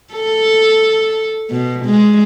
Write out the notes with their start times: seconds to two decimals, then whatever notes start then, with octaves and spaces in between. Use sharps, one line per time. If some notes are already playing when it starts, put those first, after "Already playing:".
0.14 A4
1.50 B2
1.85 G#3